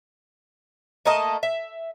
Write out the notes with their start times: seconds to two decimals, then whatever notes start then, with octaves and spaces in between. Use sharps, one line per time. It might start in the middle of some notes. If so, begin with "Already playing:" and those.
1.05 A3 A#3 D#5 A5
1.43 E5